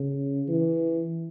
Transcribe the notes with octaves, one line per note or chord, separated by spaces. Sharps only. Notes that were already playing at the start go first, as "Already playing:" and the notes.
Already playing: C#3
E3